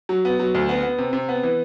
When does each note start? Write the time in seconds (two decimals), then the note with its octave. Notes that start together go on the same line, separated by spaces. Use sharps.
0.09 F#3
0.25 B3
0.39 F#3
0.55 D2
0.69 B3
0.83 B3
0.98 C3
1.13 C3
1.29 B3
1.43 E3